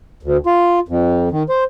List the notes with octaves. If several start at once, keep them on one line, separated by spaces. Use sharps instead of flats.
D2
F4
F2
D#3
C5